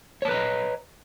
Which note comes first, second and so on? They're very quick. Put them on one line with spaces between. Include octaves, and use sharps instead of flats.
C#5 A5 B4 A#5 D#5